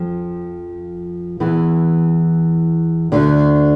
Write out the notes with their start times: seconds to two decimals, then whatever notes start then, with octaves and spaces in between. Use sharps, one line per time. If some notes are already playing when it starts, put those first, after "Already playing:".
Already playing: F2 F3
1.40 E2 E3
3.12 D2 D3